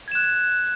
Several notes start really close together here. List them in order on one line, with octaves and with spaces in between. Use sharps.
G#6 E7 F#6